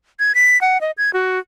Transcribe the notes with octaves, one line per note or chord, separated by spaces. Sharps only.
G#6
B6
F#5
D#5
G#6
F#4